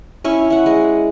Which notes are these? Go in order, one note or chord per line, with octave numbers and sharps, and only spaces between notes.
C#4 E4 C#5
E4 F#5
G#3